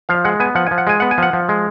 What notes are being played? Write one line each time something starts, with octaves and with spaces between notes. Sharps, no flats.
F3 F5
G#3 F#5
B3 G#5
F3 F#5
F3 G#5
F#5
G#3 G#5
B3 F#5
G#5
F3 F#5
F3
G#3